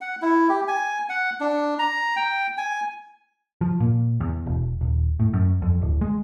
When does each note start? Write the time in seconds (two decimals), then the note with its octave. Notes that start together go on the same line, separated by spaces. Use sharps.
0.01 F#5
0.22 E4
0.49 G4
0.68 G#5
1.09 F#5
1.40 D4
1.79 A#5
2.16 G5
2.58 G#5
3.61 F3
3.80 A#2
4.20 E2
4.46 E1
4.81 D#1
5.20 A2
5.33 F#2
5.62 F2
5.82 D1
6.01 G#3